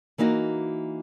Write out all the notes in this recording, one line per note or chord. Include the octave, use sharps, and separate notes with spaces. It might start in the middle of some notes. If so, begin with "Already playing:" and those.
E3 A#3 D#4 F#4 D#5